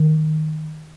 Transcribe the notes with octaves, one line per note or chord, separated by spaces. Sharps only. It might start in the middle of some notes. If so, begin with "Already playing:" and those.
Already playing: D#3